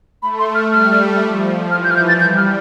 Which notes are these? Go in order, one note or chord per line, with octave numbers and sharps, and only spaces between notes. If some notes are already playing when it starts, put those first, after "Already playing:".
A3 B5
C6
F6
G3 F6
F3
E3 F6
G6
F6
G6
A6
G3 G6
F6